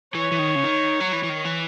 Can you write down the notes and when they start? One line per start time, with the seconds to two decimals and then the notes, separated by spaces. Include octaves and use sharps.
0.14 E3 C#5
0.32 E3
0.39 D#3
0.55 C#3
0.64 D#3
1.01 F#3
1.13 E3
1.24 E3
1.30 D#3
1.45 E3